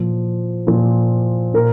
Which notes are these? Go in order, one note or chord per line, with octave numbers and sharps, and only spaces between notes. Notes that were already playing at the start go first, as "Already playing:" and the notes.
Already playing: A#2 F3
A#2 F3
A#2 A#4